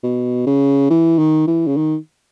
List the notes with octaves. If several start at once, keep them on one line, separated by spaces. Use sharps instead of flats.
B2
C#3
E3
D#3
E3
C#3
D#3